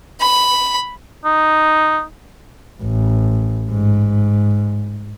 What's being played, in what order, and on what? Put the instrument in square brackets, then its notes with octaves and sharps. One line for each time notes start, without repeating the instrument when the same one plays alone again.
[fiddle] B5
[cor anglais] D#4
[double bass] A1
G#2